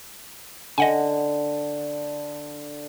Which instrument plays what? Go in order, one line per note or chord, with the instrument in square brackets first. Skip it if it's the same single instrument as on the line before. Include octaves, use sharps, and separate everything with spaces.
[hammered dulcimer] D3 [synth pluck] D#5 F#5 G#5